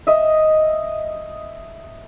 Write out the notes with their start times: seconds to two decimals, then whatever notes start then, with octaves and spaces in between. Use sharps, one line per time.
0.07 D#5 E5